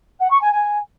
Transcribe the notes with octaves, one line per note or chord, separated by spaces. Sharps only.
F#5
C#6
G#5
G#5